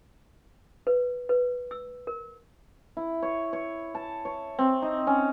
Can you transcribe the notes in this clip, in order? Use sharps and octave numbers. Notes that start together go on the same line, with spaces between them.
B4
B4
E6
A#4
E4
C#5
C#5
A5
C#5
C4
D#4
C#4